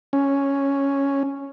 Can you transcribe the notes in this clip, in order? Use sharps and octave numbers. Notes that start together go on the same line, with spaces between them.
C#4